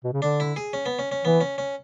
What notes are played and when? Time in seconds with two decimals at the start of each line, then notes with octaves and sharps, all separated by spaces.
0.04 B2
0.13 C#3
0.22 D3 D4
0.40 E4
0.56 G#4
0.73 C#4
0.86 B3
0.99 C#4
1.12 C#4
1.24 E3 B3
1.41 C#4
1.58 C#4